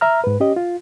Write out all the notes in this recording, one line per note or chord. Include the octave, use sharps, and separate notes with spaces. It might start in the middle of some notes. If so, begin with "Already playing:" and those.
E5 A#5 F6
G#2 B4
C#4 G4 D#5
F4